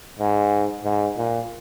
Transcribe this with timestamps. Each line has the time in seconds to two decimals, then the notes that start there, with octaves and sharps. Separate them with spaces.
0.20 G#2
0.84 G#2
1.17 A#2